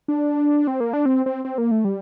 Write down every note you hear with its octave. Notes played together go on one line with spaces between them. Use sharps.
D4
C4
A#3
D4
C4
C4
C4
A#3
A3
G3